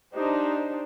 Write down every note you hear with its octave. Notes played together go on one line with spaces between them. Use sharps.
D4 D#4 G4 C5